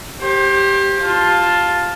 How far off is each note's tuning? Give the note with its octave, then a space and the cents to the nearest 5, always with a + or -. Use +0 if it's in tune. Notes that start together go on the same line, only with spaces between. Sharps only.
G4 +0 C5 +30
F4 +10 A5 +0